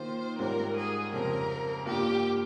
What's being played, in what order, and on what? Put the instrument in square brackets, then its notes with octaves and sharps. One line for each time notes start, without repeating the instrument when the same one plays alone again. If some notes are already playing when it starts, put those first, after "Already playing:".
Already playing: [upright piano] D#3 A#3 F4 [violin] C5
[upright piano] G#2 G3 C#4 F4 [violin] A#4
[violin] G#4
[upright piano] F2 C#3 G3 C4 [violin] A#4
[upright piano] G2 G3 A#3 F4 [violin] G4